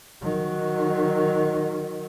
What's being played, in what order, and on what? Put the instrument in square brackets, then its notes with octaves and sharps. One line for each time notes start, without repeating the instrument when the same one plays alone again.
[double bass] D#3 F#3